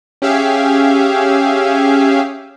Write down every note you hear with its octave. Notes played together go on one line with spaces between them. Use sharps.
C#4 G4 G#4 E5 F5